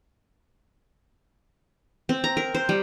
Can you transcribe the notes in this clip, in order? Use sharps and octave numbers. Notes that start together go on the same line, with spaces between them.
C4
A#5
A#4
C5
G3